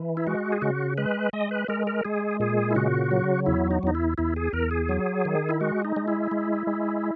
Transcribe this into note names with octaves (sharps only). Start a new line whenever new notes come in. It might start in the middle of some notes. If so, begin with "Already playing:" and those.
Already playing: E3
E4
G#3 F#4
G#4
C#3 F#4
G#3 B4
G#3 D#5
B4
G#3 A#4
A#4
G#3 G#4
A#2 G#4
E4
C#3 F#4
F#3
E2 E4
D#4
E2 D#4
E4
E2 E4
G#4
E2 A#4
G#4
F#3
D#3
E4
G#3 F#4
D#4
G#3
E4
G#3
G#3